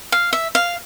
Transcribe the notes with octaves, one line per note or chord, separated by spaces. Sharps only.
F5
E5
F5